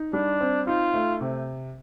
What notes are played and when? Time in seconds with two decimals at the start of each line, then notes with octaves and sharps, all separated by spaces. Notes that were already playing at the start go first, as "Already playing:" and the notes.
Already playing: D#4
0.13 G3 D4
0.41 C4
0.67 D#4 F4
0.94 A3
1.21 C3